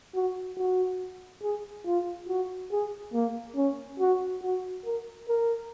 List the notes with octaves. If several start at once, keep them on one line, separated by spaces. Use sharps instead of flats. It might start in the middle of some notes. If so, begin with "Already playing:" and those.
F#4
F#4
G#4
F4
F#4
G#4
A#3
C#4
F#4
F#4
A#4
A#4